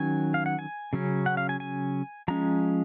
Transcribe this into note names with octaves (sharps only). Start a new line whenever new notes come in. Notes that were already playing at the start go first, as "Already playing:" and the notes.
Already playing: D#3 F#3 C#4 G#5
F5
F#5
G#5
C#3 F#3 C#4
F#5
F5
G#5
G#5
F3 G#3 C#4 A#5